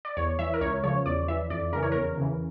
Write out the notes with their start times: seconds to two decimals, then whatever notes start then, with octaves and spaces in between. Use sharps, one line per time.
0.05 D5
0.17 E2 C#5
0.39 E3 E5
0.54 A#4
0.61 C#2 C#5
0.83 C#3 F3 C#5
1.06 E2 D5
1.28 E3 E5
1.50 F2 D5
1.73 C#3 E3 A#4
1.83 C#5
1.92 E2 A#4
2.18 C#3 E3